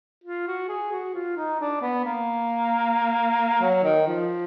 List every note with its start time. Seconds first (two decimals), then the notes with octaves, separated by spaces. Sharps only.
0.24 F4
0.47 F#4
0.69 G#4
0.92 F#4
1.14 F4
1.37 D#4
1.60 D4
1.82 B3
2.05 A#3
3.61 F#3
3.84 D#3
4.07 F3